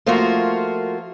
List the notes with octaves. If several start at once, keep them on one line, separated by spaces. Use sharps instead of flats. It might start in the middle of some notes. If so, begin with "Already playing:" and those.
F3 A3 A#3 F4 F#4 A#4